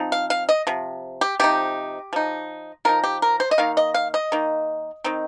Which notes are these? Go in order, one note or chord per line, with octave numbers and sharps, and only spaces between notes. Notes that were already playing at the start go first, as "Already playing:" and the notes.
Already playing: F3 C4 D#4
F5
F5
D#5
C3 F3
G4
C3 F3 D#4 G4
F3 D#4
F3 D#4 A#4
G4
A#4
C5
D#5
D#3 A#3 D#4 F5
D#5
F5
D#5
D#3 A#3 D#4
D#3 C4 D#4